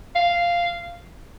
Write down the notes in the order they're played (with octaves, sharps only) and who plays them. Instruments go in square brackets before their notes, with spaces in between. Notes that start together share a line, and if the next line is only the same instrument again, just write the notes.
[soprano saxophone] F5